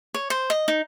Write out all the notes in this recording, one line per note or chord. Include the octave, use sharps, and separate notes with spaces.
C#5
C5
D#5
D#4